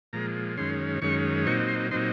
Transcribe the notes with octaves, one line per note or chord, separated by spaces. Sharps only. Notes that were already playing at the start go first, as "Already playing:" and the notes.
A#2 F3 G#3 A#5
F#2 D#3 G#3 C#4 C6
F#2 D#3 G#3 C#4 C#6
A#2 F#3 C4 D#4 C#6
C6
A#2 F#3 C4 D#4 C6